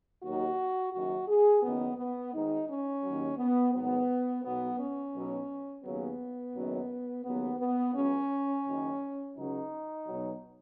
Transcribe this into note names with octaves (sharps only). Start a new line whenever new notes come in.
D#2 D#3 F#3 F#4
F#1 F#2 D#3 F#4
G#4
F#1 F#2 D#3 B3
B3
G#1 G#2 D#3 D#4
C#4
D#2 D#3 F#3
B3
G#1 G#2 F#3 B3
B1 B2 F#3 B3
C#4
B1 B2 F#3
D#2 C#3 F#3 B3
F#1 F#2 D#3 F#3
D#2 C#3 F#3 B3
B3
C#2 C#3 F#3 C#4
F#1 F#2 D#3
C#2 C#3 F#3 D#4
B1 B2 F#3